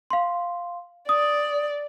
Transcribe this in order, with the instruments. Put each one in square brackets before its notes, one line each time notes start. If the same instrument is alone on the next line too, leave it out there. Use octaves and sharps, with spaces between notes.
[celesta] F5 C6
[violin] D5 [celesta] D#6